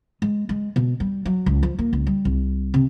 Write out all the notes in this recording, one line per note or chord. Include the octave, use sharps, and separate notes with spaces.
G#3
G#3
B2
G3
F#3
C#2
F3
A#3
C#2
G3
C2
C3